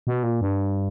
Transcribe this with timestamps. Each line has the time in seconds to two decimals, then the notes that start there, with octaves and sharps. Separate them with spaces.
0.07 B2
0.23 A#2
0.41 G2